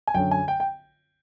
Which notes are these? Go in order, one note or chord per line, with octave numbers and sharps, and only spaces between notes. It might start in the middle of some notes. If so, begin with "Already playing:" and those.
G#5
F#2 D3 F#3 G5
G#5
G5
G5